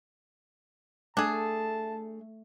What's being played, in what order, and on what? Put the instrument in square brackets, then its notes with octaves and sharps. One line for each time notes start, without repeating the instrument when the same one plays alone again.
[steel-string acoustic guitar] A3 [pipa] D4 G#4 [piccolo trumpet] A5